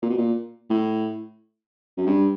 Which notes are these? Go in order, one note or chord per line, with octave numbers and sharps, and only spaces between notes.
A#2
B2
A#2
A2
F#2
G2